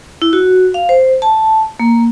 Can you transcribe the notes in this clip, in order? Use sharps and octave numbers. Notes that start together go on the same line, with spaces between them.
E4
F#4
F5
C5
A5
A#3